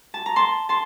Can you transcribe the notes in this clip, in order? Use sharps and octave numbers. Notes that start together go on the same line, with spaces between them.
A5
A#5
A5 C6
A5 C6